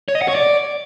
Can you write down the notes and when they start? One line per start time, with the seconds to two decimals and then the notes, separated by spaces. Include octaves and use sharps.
0.08 C#5
0.15 D#5
0.22 F#5
0.28 C#5
0.35 D5